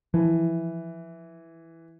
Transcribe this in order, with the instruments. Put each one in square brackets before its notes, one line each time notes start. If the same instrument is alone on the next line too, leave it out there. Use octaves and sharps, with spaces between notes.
[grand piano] E3 [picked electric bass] F3